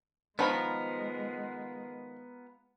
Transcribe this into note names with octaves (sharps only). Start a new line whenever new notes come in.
D#3 F3 G#3 B3 F4 A#4 B5